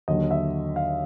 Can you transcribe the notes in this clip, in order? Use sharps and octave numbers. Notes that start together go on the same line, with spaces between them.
D#2 D3 F#3 D#5
E5
F5